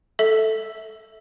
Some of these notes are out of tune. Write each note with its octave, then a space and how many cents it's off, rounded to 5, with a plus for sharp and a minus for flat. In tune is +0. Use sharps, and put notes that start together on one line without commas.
A4 +0 E5 -10